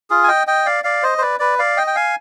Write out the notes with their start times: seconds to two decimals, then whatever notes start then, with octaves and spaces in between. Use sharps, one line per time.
0.10 F4 G#4
0.24 G#5
0.28 D#5 G5
0.47 D#5 G5
0.66 D5 F5
0.84 D5 F5
1.03 C5 D#5
1.18 C5
1.21 B4 D5
1.39 B4 D5
1.59 D5 F5
1.77 D#5 G5
1.87 G5
1.95 F5 G#5